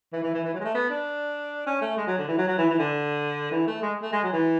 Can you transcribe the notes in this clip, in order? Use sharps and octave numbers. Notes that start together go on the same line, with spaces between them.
E3
E3
E3
E3
F#3
G#3
A3
B3
D4
C#4
A3
G#3
F#3
D3
E3
F#3
F#3
E3
E3
D3
E3
A3
G#3
A3
G#3
F#3
E3